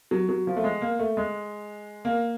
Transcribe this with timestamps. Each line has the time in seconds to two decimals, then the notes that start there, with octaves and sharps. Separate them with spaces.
0.11 F#3
0.29 F#3
0.47 F3
0.56 A3
0.64 G#3
0.81 A#3
0.99 A3
1.17 G#3
2.05 A#3